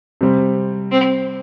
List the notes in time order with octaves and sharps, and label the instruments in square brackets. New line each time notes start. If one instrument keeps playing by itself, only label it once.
[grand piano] C3 G3 C4
[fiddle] C4